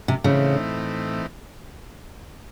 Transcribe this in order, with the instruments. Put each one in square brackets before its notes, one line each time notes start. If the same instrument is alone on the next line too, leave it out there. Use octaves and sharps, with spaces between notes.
[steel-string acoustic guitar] C3
[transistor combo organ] A2 E3 A3 C4 D#4 [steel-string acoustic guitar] C#3